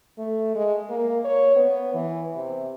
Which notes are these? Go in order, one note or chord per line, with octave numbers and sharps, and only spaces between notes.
A3
G#3
A#3
C#5
B3
E3
C3